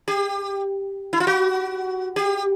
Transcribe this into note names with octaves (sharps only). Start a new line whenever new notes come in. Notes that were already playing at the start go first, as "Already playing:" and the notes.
G4
E4
F4
F#4
G4